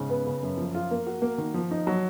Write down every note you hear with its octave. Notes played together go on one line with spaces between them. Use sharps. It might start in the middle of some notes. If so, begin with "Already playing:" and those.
Already playing: G#2 C#3
B3
C#3
F#2
F3
F4
A#3
F#4
A#3
D#3
F3
D#4
F#3